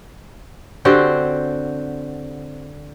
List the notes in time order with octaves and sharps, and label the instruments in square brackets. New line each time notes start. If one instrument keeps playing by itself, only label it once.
[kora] D3 C4 F#4 G4